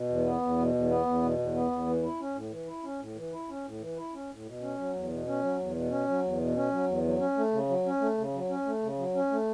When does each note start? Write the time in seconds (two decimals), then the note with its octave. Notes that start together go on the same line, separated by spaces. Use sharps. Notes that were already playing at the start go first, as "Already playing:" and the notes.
Already playing: B2
0.09 E2
0.26 B3
0.41 E2
0.58 B2
0.74 E2
0.90 B3
1.06 E2
1.22 B2
1.38 E2
1.55 B3
1.71 E2
1.87 E3
2.03 E4
2.20 C#4
2.35 A2
2.51 E3
2.68 E4
2.83 C#4
3.00 A2
3.16 E3
3.32 E4
3.49 C#4
3.65 A2
3.80 E3
3.96 E4
4.13 C#4
4.30 A2
4.45 B2
4.62 C#4
4.78 F#3
4.93 E2
5.11 B2
5.27 C#4
5.42 F#3
5.59 E2
5.75 B2
5.90 C#4
6.08 F#3
6.24 E2
6.39 B2
6.56 C#4
6.72 F#3
6.88 E2
7.04 F#3
7.20 C#4
7.37 A3
7.52 C#3
7.69 F#3
7.86 C#4
8.01 A3
8.18 C#3
8.34 F#3
8.49 C#4
8.66 A3
8.83 C#3
8.98 F#3
9.15 C#4
9.31 A3